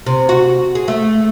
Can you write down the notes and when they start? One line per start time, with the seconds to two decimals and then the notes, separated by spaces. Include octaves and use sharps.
0.06 C3
0.29 F#4
0.75 G#4
0.88 A3